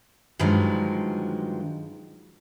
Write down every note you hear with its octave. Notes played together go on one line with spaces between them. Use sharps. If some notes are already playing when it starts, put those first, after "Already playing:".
G2 D3 D#3 F3 F#3 G#3